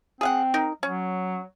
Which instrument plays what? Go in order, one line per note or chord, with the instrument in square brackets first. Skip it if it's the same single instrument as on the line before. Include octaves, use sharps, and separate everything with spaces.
[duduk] C4 [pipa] G#4 F5 F#5
[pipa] D#4 A#4
[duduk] F#3 [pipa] C#4